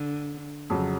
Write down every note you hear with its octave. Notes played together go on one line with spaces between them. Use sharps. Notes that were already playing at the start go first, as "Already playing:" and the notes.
Already playing: D3
F2 C#3 F#3